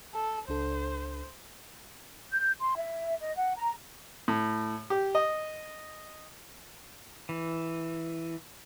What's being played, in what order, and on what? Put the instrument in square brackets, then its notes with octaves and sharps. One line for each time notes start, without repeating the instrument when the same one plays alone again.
[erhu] A4
[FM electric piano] C#2 D4 A4 [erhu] C5
[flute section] G6
C6
E5
D#5
F#5
A#5
[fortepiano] A2
G4
D#5
[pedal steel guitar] E3